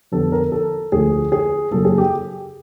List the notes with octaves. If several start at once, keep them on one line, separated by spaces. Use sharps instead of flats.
F2 D3 G3 B3 A4
A#4
A4
D2 D3 F3 G#4
G#4
F#2 C#3 F#3 A#3 A4
G#4
G4